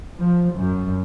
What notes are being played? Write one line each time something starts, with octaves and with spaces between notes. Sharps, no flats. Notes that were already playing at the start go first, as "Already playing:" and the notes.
F3
F#2